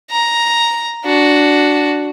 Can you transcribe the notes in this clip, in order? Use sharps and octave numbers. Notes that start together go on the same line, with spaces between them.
A#5
D4 F#4